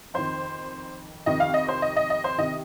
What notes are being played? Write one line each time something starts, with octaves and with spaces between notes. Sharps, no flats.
F2 D#3 C5
F2 C3 D#3 D#5
F5
D#5
C5
D#5
D#5
D#5
C5
C3 D#3 D#5